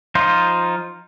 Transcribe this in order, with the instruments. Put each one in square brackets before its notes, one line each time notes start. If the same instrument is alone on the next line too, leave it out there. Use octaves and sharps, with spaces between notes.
[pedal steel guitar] F3 D#4 F4 C5